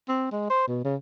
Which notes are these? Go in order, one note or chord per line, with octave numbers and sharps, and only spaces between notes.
C4
G#3
C5
B2
C#3